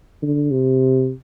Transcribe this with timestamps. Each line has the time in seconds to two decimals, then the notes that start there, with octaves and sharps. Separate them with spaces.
0.22 D3
0.51 C3